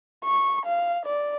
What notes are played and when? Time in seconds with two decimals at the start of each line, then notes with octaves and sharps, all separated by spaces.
0.25 C#6
0.66 F5
1.05 D5